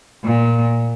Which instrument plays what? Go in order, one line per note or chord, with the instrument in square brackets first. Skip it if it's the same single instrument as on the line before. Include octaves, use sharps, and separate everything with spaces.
[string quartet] A#2